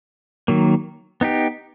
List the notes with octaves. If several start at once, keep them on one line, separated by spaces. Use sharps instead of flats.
D#3 F#3 A#3
B3 D#4 G4